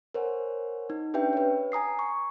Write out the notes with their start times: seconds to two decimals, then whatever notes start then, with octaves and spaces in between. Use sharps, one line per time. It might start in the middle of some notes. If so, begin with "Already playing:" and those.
0.14 A#4 C5 C#5 F#5 G#5
0.90 D#4
1.14 C#4 D4 G4 B4 E5 G5
1.33 B4 C#5
1.72 G#5 A#5 D#6 C7
1.99 C#6